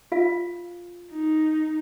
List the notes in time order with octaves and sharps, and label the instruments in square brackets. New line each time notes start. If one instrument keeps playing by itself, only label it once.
[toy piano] F4 F5
[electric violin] D#4